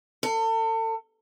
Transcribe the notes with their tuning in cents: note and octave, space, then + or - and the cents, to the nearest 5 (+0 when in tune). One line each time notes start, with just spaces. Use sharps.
A4 +35